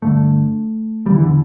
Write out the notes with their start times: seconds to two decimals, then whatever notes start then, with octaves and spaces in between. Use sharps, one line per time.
0.02 G2 D3 A3
1.06 E2 D3 G3
1.15 E3
1.24 D3